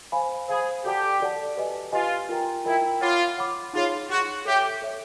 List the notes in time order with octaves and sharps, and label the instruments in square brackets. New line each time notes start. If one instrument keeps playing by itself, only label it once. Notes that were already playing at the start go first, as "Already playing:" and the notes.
[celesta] C5 F5 G#5 B5
[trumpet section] G#4 [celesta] C5 F5 G#5 B5
[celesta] F#4 A4 D5 F#5 A5 [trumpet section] G4
[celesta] F#4 A4 D5 F#5 A5
G4 B4 D#5 G#5
[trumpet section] F4 [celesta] G4 B4 D#5 G#5
[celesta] F4 A#4 D#5 G5 A#5
[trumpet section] E4 [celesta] F4 A#4 D#5 G5 A#5
[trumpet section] F4 [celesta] C#5 F#5 B5 D6
[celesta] C#5 F#5 B5 D6
[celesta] D#4 G#4 C#5 [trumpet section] F4
[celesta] D#4 G#4 C#5 [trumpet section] F#4
[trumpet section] G4 [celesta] A4 C#5 E5
[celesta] A4 C#5 E5